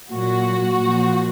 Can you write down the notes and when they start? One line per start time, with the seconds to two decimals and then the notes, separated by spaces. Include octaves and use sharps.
0.12 A#2 F#3 F#4
0.78 A#2 F3